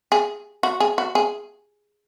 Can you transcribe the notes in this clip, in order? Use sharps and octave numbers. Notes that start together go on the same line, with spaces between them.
G#4
F#4
G#4
F#4
G#4